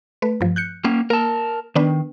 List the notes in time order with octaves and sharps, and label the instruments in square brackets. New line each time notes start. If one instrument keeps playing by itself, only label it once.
[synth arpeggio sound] A3 B4
G2 F3
F#6 G6 C#7
[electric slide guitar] A#3 C#4
[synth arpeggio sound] A#3 [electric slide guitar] A#4 A5
[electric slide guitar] D#3 [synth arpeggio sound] B3 D4 B4